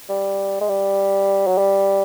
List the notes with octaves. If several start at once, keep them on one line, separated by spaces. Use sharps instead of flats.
G3
G#3
G3
F#3
G3